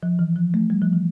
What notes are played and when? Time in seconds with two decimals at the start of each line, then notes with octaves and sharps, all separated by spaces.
0.03 F3
0.19 E3
0.36 F3
0.54 A3
0.70 G3
0.82 F3
0.93 E3